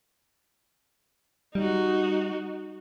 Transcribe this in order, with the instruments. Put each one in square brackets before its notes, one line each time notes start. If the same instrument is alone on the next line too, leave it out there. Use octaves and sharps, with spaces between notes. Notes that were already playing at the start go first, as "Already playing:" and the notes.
[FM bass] G3 [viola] D#4 F#4